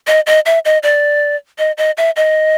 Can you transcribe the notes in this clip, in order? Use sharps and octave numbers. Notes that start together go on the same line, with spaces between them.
D#5
D#5
E5
D#5
D5
D#5
D#5
E5
D#5